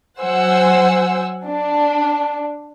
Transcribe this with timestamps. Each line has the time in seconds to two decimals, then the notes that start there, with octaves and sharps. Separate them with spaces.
0.20 F#3 C5 F#5 G#5 E6
1.45 D4